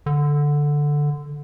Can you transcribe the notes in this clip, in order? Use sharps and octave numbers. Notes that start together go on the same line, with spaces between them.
D3